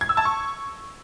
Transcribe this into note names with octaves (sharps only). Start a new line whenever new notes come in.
G#6
E6
A5
C#6